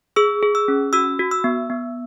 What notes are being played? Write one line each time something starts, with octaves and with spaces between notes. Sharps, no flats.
G#4 E6
G#4
E6
C#4
F#4 E6
F#4
E6
B3
B3